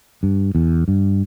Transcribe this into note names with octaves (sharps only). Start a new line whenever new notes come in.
G2
E2
G2